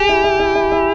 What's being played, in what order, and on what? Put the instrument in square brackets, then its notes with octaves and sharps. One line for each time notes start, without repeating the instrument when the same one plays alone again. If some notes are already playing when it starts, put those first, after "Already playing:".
Already playing: [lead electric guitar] G4 [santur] G#4
[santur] E4
E4
E4
E4
E4